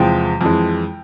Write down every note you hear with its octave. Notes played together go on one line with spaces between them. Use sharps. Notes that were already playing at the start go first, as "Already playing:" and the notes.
Already playing: E2 C3 F3 G#3 G5
F2 E3 G#3